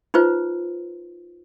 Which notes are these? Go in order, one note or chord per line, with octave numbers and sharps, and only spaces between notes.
D#4 F4 B4 C5